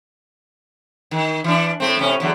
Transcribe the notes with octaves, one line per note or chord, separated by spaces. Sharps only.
D#3
E3 D4
A2 A3 C4
A2 C3 C#4
E2 D3 F#3